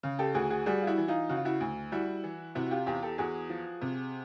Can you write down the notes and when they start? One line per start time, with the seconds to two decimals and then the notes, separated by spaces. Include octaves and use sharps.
0.03 C#3
0.19 G4 A4
0.35 D2 F#4 G#4
0.50 F#4 G#4
0.66 G3 F#4 G#4
0.82 F4
0.87 E4 F#4
0.98 E3
1.08 D#4 F4
1.29 C#3 F#4
1.37 F4
1.45 E4 F#4
1.61 D2
1.92 G3 E4 F#4
2.24 E3
2.55 C3 E4 F#4
2.66 F#4
2.71 F4 G4
2.86 E2 F4 G4
3.02 G4 A4
3.18 E2 F#4 G#4
3.50 F3
3.81 C3